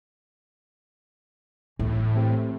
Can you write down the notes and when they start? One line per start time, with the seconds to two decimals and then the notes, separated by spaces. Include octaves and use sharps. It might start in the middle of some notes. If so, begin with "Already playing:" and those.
1.79 A2 E3
2.15 A3 C4 G4